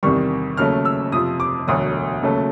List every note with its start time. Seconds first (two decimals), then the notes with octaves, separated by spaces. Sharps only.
0.03 E2 C3 D#3 G3 C#6
0.57 D#2 C#3 F#3 A3 F6
0.85 E6
1.12 F2 C3 F3 D#6
1.40 D6
1.67 E1 D2 D3 F#3 D#6
2.23 D#2 C#3 F#3 A3